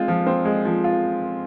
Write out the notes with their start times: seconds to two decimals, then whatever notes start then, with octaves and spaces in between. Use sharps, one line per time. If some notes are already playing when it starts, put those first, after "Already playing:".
Already playing: G#3 C4 F4
0.08 F3
0.26 C4
0.45 G#3
0.65 F3
0.84 F4